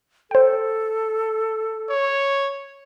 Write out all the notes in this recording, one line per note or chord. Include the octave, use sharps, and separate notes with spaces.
A4 C5 G5
C#5